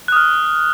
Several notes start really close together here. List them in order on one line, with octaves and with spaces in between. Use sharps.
F#6 D#6 F6